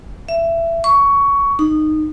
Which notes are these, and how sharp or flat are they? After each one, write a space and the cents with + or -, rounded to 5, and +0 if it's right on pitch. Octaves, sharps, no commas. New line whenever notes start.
E5 +20
C#6 +15
D#4 -20